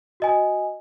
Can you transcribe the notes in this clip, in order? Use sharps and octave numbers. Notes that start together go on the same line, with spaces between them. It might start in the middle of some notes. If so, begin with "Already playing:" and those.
F#4 D#5 G#5